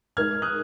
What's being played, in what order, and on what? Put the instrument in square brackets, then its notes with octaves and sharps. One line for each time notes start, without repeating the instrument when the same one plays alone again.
[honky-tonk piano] G#3 D#4 A#4 [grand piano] F6 G#6
[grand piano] D#6 F#6